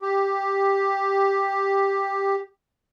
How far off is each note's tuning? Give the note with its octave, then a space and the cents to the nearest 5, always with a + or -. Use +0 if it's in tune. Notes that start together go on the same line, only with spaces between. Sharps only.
G4 +5